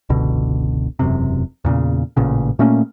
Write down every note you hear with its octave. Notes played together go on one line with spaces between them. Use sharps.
F#1 C#2 B2 D3
E1 F#2 C3
E2 A#2 C#3
A1 A#2 C#3
A#2 A3 A#3 C#4